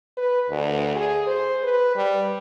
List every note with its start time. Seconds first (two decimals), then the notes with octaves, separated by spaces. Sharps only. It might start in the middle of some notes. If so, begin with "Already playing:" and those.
0.17 B4
0.50 D2
0.96 G#4
1.27 C5
1.64 B4
1.96 G3